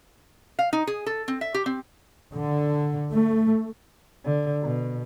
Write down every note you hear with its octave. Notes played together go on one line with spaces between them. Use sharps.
F5
D#4
G#4
A4
C4
E5
G4
C4
D3
A3
D3
B2